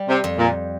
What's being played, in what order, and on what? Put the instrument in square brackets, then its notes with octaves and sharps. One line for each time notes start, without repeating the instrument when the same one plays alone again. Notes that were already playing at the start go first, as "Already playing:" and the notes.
Already playing: [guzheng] G3
[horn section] C3
[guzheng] F2
[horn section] A#2